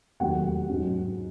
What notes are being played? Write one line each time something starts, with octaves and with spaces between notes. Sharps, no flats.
E1 D#2 D#3 F#3 A3 F#5
G#2 F#3 C#4